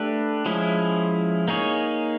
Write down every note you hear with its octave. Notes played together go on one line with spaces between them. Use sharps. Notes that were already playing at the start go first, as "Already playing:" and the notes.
Already playing: A3 D4 G4 B4
F3 G#3 C#4 E4
A#3 D#4 G#4 C#5